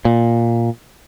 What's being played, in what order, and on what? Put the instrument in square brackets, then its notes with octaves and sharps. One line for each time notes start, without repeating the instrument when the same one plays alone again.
[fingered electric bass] A#2